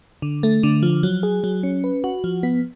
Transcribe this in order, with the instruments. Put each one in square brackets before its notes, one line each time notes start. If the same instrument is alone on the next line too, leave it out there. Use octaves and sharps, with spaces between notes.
[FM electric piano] D3
A3
D3
F3
F#3
G#4
F#3
C#4
B4
F#4
F3
B3